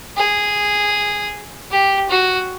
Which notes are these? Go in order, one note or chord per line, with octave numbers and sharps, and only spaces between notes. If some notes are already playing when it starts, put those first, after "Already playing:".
G#4
G4
F#4